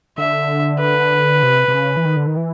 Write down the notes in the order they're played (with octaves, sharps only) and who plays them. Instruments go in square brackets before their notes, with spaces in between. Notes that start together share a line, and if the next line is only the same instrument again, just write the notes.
[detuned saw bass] D3 [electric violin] E5
[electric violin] B4
[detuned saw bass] C3
C3
C#3
E3
D#3
D3
D#3
E3